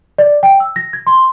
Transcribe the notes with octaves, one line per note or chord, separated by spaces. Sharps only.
D5
G5
E6
A#6
G#6
C6